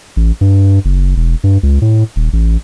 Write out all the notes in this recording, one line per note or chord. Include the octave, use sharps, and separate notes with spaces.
A1
G2
F#1
E1
G2
C#2
A2
D#1
A1